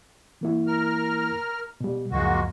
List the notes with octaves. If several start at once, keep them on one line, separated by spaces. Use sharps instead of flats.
E3 A#3 E4
A#4 F6
B2 G3
C#2 F#2 F3 G#3 A#3 F#4